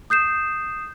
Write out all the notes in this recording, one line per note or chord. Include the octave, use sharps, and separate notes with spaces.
D#6 G6 C7 E7